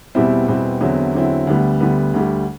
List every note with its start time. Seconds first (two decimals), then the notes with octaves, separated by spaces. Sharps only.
0.15 E2 B2 G3 C4 E4
0.47 E2 B2 G3 C4 E4
0.81 E2 D3 F#3 C4 E4
1.15 E2 D3 F#3 C4 E4
1.47 D2 D3 G3 B3
1.80 D2 D3 G3 B3
2.14 D2 D3 G3